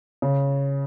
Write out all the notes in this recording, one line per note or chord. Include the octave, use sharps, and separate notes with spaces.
C#3